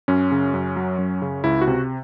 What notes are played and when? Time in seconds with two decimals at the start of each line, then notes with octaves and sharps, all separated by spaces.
0.08 F#2 C#4
0.32 C#3
0.54 F#2
0.76 F#3
0.98 F#2
1.22 C#3
1.44 C#2 E4
1.61 F#4
1.68 C3